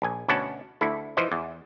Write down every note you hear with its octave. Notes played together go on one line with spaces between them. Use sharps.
A#1 G#5
D2 B2 C#4 F#5 A5
D2 E4 A4
E3 F3 C5 D#5
E2